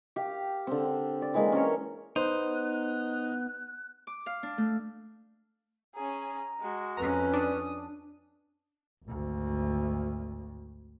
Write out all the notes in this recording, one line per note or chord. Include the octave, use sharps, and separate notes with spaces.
G4 F5 G5
D3 C4
D5
E3 G#3 A#3
C#4 A4 A#4 C#5
B3 D#4 C5 F#6
D6
F5
D4
A3
C#4 G#4 A#5
G#3 F#4
F2 C#4 B4 A#5
D4 D#6
G#1 D2